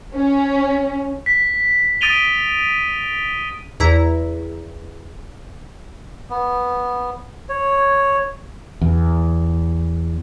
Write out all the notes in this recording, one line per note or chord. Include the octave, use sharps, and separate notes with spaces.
C#4
B6
D#6 A6 D7 D#7 F7 G7
E2 E4 A#5
B3
C#5
E2